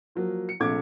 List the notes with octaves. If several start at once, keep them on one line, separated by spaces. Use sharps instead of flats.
F3 F#3 A#3
C#7
A#1 C3 A3 D6 G#6